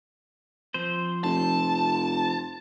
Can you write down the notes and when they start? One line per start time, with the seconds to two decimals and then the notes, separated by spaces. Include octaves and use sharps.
0.74 F3 C4 C5
1.24 F1 A5